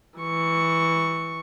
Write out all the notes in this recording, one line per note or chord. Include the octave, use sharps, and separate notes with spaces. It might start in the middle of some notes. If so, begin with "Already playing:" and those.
E3 C#6